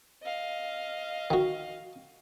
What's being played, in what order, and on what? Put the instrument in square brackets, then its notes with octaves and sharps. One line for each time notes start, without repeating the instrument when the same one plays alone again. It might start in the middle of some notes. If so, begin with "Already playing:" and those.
[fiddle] D#5 F5
[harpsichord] D#3 F#4